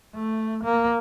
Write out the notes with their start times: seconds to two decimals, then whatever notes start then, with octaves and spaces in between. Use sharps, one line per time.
0.15 A3
0.64 A#3